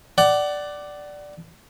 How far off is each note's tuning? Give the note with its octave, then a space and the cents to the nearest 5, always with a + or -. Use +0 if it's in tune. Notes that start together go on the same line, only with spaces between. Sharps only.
D5 +0 F#5 +30